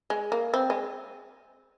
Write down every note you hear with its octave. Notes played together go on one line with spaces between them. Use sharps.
G#3
A#3
C4
G#3